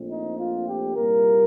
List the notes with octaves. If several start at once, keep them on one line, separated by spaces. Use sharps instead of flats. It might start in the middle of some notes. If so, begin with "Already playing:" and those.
Already playing: A#1 A#2 A3 C4
D#4
F4
G4
C2 A#2 G3 A#3 A#4